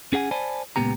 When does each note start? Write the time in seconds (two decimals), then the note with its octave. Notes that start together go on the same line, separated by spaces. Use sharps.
0.13 C#4 G#4 F#5 G#5
0.31 C5 D5 G#5 A5 B5
0.76 C#2 G2 A#2 B3 G4 A#5